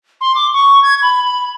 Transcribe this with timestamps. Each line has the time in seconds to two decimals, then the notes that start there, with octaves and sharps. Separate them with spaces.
0.21 C6
0.35 D6
0.53 C#6
0.83 G#6
1.02 B5
1.23 B5